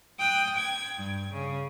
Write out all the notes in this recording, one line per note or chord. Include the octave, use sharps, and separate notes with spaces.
G5 D#6 F#6
G5 G#6
G2
C#3